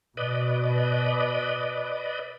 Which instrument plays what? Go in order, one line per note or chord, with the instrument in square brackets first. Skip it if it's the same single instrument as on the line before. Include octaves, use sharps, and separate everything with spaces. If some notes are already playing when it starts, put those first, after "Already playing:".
[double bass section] B2 [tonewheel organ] B4 D5 D#5